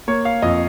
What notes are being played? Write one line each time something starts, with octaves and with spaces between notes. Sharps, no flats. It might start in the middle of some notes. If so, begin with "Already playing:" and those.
A#3 C#5
F5
F2 D#5